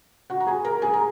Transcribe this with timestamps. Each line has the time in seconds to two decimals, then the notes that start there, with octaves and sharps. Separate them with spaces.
0.30 F#4 F#5
0.40 A#5
0.47 G#4 G#5
0.65 A#4 A#5
0.82 G#4 G#5
0.93 A#5